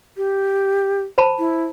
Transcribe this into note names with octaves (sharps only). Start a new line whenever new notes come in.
G4
C5 A5 B5
E4